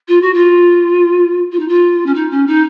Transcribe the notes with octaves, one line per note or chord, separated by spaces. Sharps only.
F4
F#4
F4
F4
D#4
F4
C#4
D#4
C#4
D#4